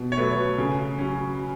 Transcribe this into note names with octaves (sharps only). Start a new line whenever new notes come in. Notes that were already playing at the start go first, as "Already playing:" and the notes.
Already playing: B2
C#5
F#3 A3 B4
C#3
F#3 C#4